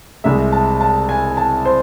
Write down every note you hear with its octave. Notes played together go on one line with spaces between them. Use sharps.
C2 C3 G#3 E5
A5
A5
G#5
A5
C5